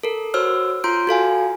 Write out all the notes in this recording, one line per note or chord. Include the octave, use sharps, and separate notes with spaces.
A4 A#4
F#4 C5 C#5 E6 F6
F4 A#5 C6 G6 D7
F#4 A4 F5 G#5